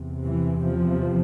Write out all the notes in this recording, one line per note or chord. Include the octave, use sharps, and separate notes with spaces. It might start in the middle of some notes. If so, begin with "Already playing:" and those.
Already playing: E2 C3
E3
F3